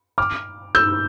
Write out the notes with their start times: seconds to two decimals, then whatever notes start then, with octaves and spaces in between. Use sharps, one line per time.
0.18 D6 F6
0.75 E6 G6